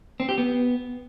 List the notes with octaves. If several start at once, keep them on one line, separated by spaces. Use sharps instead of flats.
C4
G4
B3